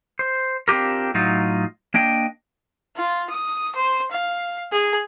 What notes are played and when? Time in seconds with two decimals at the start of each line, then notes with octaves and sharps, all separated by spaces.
0.19 C5
0.68 C4 D4 F4 G4 A#4
1.14 A2 F#3 D#4 F4
1.94 A#3 D4 D#5 G5
2.97 F4
3.30 D#6
3.75 C5
4.11 F5
4.72 G#4